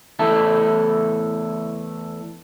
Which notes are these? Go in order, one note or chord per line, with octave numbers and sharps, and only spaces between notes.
E2 A3 E4 A4